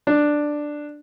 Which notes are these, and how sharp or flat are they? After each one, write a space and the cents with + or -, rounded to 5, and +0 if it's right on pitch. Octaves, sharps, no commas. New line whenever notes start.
D4 +5